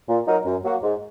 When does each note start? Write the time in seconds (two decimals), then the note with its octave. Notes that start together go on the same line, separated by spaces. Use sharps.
0.09 A#2
0.27 F#3 D#4 A#4
0.46 F#2
0.64 F#3 A#3 F#4
0.83 G#2